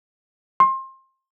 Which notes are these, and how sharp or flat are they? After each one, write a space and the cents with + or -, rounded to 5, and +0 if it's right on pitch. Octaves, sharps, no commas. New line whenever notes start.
C6 +25